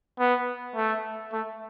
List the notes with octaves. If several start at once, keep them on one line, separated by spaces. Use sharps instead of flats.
B3
A3
A3